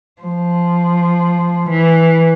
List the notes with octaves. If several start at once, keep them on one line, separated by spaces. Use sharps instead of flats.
F3
E3